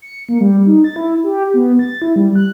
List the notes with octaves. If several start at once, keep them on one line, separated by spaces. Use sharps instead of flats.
C#7
A#3
G3
D#4
A6
E4
G4
B3
A6
E4
G3
F#6